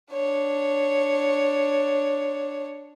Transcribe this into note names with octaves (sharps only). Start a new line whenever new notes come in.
D4 C#5